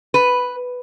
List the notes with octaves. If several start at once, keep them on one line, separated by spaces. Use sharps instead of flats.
B4